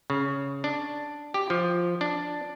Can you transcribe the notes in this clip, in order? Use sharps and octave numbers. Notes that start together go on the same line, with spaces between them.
C#3
D4
G4
F3
D4